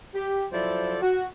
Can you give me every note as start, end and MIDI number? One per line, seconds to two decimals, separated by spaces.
0.15 0.46 67
0.52 0.97 53
0.52 0.97 54
0.52 0.97 64
0.52 0.97 69
0.52 0.97 72
0.52 0.97 74
1.02 1.26 66